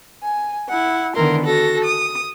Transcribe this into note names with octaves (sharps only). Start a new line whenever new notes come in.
G#5
E4 F#5
D3 D#3 B3 E4 A#4 C6
F#4 A4 A#6
D#6